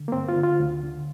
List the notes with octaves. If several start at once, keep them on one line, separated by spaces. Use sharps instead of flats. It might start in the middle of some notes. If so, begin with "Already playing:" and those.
Already playing: D3
A#3
G2 C4
F4
D3
F4
D2
D3